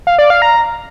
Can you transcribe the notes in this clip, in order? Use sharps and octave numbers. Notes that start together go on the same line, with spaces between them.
F5
D5
F5
A#5